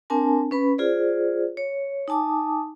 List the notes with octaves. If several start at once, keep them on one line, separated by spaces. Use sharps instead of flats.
C4 D4 A#4 G#5 A5
C#4 B4 B5
F4 G#4 C5 D5
C#5
D#4 G#5 A5 D6 D#6